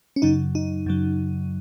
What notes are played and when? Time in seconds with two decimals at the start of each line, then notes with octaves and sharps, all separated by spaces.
0.16 C#4
0.22 F#2 C#3 F#3 D#4
0.55 D#4
0.86 F#2 C#3 F#3